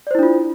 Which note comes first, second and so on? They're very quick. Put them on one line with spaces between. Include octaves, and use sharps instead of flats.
D5 C5 E4 D4 F4